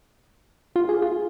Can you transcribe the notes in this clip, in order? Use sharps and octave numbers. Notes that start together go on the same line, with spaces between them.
F4
G#4
F4